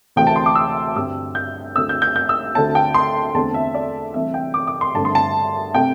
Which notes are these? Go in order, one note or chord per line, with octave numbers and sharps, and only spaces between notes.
D2 C3 E3 A3 C4 G5
A5
C6
D6
E6
G2 D3 G3 C4 E6
G6
D2 D3 A3 C4 E6
G6
G6
G6
E6
D2 D3 A3 C4 A5
G5
C6
E2 D3 A3 C4 A5
E5
D5
C2 C3 E3 A3 C4 E5
G5
D6
D6
C6
G2 D3 A3 C4 A5
C6
A5
C3 A3 G5